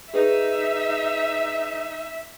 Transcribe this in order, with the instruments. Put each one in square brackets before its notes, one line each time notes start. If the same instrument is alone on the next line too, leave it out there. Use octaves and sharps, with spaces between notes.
[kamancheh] D#4 [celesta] G#4 B4 [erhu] E5